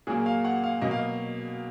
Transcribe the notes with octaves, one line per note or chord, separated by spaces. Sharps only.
A#2 F#3 A#3 G#4
F5
F#5
F5
B2 F#3 A#3 D#5
F5
D#5